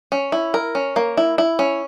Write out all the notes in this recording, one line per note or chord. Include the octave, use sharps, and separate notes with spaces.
C#4
E4
A#4
C#4
A#3
E4
E4
C#4